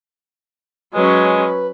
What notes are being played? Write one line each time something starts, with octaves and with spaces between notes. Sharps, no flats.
F#3 G#3 C#4 B4